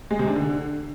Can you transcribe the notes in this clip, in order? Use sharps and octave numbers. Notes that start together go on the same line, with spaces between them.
G#3
C3
D4
D3